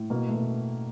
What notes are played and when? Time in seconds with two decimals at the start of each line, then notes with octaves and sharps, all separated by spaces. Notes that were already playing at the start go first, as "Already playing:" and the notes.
Already playing: A2
0.10 B2 A#3
0.29 A3
0.35 B2